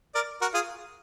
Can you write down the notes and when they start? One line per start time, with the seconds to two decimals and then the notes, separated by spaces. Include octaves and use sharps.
0.15 A#4 D5
0.42 F#4 A#4
0.54 F4 G#4